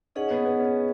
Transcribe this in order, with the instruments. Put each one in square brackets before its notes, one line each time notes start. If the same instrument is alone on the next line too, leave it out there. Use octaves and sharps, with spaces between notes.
[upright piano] C#4 [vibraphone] D#4 G#4 D#5 F#5
[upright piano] B3
B3
C#4